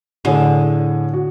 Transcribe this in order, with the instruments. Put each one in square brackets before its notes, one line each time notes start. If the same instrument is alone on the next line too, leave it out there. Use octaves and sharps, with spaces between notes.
[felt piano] A2 G#4 D5 [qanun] D3
[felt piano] F#4